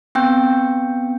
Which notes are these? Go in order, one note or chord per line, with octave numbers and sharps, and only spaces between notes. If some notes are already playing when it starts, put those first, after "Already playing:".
B3 C4 G5 G6